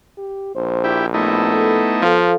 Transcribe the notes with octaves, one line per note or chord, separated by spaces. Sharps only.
G4
A#1 C5
E4 G4
A3 B3 D#4 E4
A4
F3 A4 F5